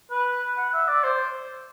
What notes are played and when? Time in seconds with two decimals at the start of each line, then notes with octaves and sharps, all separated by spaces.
0.11 B4
0.57 F#5
0.73 E5
0.88 D5
1.04 C5